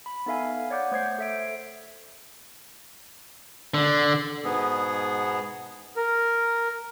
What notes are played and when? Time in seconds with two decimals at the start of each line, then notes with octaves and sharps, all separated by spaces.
0.06 B5
0.26 B3 D#4 A4 E5 F5 G#5
0.71 C#5 D5 F#5 D6 G6
0.91 A3 C5 G#6 C7
1.18 A4 E5 D7
3.74 D3
4.44 G#2 B2 B3 G#4
5.96 A#4